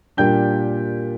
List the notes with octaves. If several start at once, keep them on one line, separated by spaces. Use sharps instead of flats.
A#2 G3 A#3 D4 G5 G6